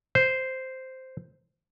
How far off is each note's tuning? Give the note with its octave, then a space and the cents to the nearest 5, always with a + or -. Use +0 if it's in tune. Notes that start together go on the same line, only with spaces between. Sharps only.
C5 -5